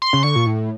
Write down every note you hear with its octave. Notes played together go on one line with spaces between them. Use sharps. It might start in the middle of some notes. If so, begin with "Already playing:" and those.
C6
C#3
D3 C#6
A#2
A2